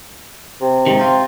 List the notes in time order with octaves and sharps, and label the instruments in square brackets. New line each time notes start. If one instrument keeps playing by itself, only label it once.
[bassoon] C3
[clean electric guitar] G#2 D#3 [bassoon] C3
[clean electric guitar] C4 F4